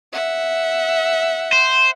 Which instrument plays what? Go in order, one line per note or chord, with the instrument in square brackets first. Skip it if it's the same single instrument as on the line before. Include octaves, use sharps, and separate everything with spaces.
[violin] E5 F#5
[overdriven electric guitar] C5